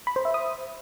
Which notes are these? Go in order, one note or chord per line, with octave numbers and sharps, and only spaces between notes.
B5
C5
E5
D#6